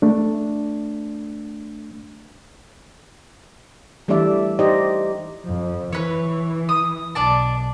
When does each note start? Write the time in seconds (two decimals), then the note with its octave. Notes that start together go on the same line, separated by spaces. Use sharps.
0.02 A3 D4
4.08 E3 G3 A3 D4 D5 E5
4.59 D#4 G4 C5 D5 D#5
5.45 F2
5.93 E3 B4 C#5
6.69 D#6
7.15 B1 D4 D5 A5